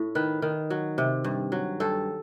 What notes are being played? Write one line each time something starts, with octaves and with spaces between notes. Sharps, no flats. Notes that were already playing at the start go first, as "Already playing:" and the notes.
Already playing: A2
D#3 B4
D#3
F#3
C3
G2
F#3
G2 A4